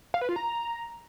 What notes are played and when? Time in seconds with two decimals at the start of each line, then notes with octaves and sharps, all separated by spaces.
0.14 F5
0.21 B4
0.29 F4
0.36 A#5